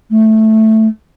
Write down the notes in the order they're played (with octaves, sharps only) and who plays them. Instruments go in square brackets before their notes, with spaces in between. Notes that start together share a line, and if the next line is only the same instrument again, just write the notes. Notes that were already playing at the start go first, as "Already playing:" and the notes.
[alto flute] A3